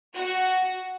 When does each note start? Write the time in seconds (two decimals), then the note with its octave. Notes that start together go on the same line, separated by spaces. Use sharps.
0.15 F#4